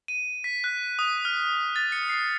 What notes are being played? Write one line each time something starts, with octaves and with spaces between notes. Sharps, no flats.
D#7
B6
F#6
D#6
F6
A6
C#7
C7